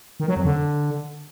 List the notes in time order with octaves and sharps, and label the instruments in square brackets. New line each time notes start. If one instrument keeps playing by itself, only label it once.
[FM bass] D#3
F#3
F2
D3